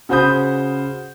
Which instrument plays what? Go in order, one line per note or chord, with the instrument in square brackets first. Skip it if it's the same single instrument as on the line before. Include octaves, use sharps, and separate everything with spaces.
[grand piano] C#3 F#4 C5 B5 D#6 G6